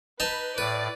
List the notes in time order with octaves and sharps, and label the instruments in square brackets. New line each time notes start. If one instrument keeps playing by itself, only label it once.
[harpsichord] D#4 A5 [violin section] B4
[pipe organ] A2 [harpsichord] B4 [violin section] D5